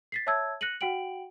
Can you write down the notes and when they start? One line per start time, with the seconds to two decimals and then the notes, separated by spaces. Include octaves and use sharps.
0.12 A6 B6 C7
0.27 C#5 E5 A5 E6 G#6
0.61 F#6 A#6 C#7 D#7 F#7
0.81 F#4 F#5 G5 D7 F#7